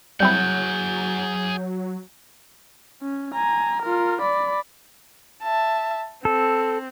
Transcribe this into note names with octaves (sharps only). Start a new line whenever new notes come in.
F#3 G3 C4 E4 G#4 F#5 G6
C#4
G#5 A#5
F4 A#4
D5 B5
E5 A5
C4 A4